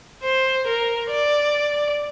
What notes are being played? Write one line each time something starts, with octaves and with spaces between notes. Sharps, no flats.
C5
A#4
D5